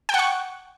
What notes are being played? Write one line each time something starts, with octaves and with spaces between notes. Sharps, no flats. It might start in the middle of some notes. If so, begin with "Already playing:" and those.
F#5 G5 C#6